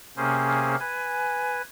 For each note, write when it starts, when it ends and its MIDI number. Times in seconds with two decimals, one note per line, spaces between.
0.17 0.76 48
0.17 0.76 58
0.17 0.76 61
0.17 0.76 68
0.17 0.76 72
0.80 1.62 71
0.80 1.62 80